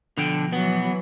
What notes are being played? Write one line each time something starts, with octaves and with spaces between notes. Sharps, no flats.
B2 D3 F3 G5
E3 F#3 B3